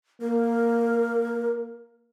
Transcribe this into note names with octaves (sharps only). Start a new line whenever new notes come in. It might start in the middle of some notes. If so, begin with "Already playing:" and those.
A#3 A#4